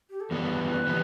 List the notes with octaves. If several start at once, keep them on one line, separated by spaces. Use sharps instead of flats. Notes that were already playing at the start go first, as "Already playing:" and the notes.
G4
A4
F#2 E3 G3 B3 B4
E3 G3 B3